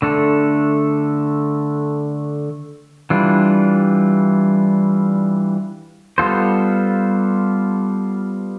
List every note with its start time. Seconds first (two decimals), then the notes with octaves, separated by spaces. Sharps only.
0.02 D3 A3 D4 A4
3.10 E3 G3 D4 F4
6.18 G3 B3 F4 A4 C5